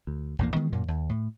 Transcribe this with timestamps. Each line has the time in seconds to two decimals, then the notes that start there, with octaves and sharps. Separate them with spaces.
0.07 D2
0.39 A#1 E2 A2 A#3
0.55 D#3 E3 G#3 B3
0.72 F#2 A#2 A#3
0.88 D#2
1.09 A2